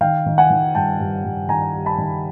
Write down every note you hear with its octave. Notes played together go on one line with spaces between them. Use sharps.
D#3 F5 G5
D#3
F#5 G#5
D#3
G2 G5 A5
G2
G2
D#3 G#5 A#5
G3
A5 B5
D#3